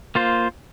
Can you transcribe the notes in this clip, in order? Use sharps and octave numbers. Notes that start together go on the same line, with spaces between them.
A#3 F4 C5